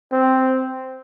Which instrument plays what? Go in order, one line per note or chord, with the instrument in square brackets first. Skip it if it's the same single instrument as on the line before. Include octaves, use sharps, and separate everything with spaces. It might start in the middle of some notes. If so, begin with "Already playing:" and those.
[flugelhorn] C4